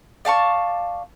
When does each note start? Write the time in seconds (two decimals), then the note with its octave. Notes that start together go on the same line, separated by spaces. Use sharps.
0.25 D5 F5 A5 C#6